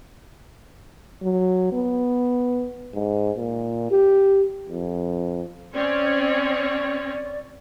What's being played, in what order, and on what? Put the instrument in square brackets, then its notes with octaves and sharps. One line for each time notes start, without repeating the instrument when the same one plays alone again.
[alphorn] F#3
B3
[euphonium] G#2
A#2
G4
F2
[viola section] C4 C#4 C#5 [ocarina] D5